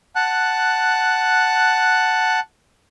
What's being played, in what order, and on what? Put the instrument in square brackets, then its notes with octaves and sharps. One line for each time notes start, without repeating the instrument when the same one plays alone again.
[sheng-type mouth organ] F#5 A5 F#6